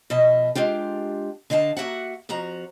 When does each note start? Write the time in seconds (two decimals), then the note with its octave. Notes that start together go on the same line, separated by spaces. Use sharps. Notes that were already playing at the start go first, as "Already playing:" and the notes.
0.10 B2 F3 D#5 E5 A5
0.55 G#3 D4 F4 G4
1.50 D3 D#5 F5 G5 A5
1.77 A#3 F#4 E5 F#5
2.29 F2 F3 F#4 A#5